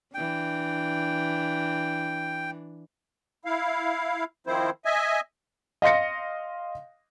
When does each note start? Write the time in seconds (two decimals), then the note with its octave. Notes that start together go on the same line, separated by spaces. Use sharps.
0.14 E3 D4 G5
3.45 E4 F5
4.47 D#3 F3 C4 E4 C5
4.85 D#5 E5 G#5
5.82 D#5 F5 C6 A#6 C#7